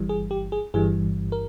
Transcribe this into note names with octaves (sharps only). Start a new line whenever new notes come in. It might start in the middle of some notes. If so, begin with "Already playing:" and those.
Already playing: G1 G2 E3 G3
G#4
G4
G#4
G1 G2 E3 G3 G#4
A#4